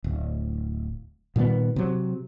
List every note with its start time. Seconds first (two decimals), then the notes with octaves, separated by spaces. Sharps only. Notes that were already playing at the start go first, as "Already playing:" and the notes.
0.04 D1
1.36 A#2 D#3 G3 B3
1.76 C3 F#3